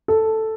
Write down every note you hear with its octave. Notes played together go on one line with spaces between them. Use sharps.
A4